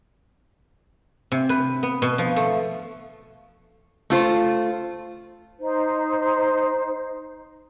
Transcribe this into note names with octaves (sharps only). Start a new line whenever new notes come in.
C3
B4
B3
B2
F3
A3
A3 F4 C5
D#4 C5